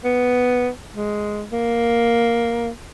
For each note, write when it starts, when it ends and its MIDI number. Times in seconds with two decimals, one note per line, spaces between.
0.04 0.69 59
0.96 1.44 56
1.52 2.69 58